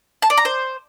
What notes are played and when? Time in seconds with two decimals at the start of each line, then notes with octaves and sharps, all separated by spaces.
0.22 A5
0.30 D5
0.37 A#5
0.45 C5